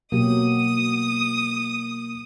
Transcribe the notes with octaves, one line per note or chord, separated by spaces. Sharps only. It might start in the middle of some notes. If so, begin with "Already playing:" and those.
B2 F#3 A#3 G4 D#6